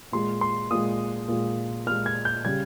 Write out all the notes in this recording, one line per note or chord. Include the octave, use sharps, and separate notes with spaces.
A#2 G#3 C6
C6
A#2 G#3 D#6
A#2 G#3
A#2 G#3 F6
G#6
G6
C#3 G3 G#6